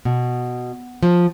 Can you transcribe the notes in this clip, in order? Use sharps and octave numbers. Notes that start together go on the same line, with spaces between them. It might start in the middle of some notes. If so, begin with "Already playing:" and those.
B2
F3